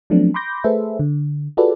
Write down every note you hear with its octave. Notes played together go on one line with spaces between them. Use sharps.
F3 F#3 A3 B3 C4 D4
B5 C6 D6 G6 A#6
A3 G#4 A4 B4 C5 E5
D3
F4 F#4 G#4 A4 B4 D5